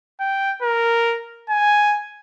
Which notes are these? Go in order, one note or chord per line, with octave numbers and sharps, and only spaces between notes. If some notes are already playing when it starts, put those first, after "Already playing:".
G5
A#4
G#5